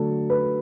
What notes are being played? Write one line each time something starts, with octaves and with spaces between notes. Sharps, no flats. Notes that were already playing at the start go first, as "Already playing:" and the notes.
Already playing: D3 F#3 A3 A4
B4